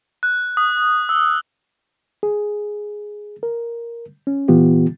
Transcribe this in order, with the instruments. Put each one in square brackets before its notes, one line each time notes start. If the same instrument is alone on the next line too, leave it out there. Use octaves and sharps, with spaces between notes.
[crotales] F#6
D#6
E6
[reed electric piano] G#4
A#4
C#4
A#2 E3 B3 F4 G4